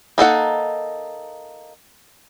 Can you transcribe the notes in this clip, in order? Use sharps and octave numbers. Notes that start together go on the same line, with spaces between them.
A#3 D#4 A4 F#5